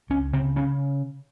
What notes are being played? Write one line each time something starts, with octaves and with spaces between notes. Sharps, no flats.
C#2 C#4
C#3 C4
C#3 C#4